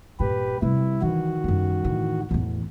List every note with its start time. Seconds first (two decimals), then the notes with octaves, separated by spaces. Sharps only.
0.20 G2 A#2 G4 B4
0.62 C3 G3 E4
1.02 D#3 E3 F#4
1.44 F#2 G3
1.84 A2 E3
2.31 E2 A2 B3